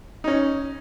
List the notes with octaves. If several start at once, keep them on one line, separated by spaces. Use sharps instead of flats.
C#4 D#4